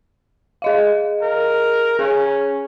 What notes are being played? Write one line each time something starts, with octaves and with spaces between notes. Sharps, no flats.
G#4 D#5 F5
A#4
C#4 G#4